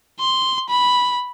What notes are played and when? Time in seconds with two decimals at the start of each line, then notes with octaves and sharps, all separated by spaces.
0.19 C6
0.70 B5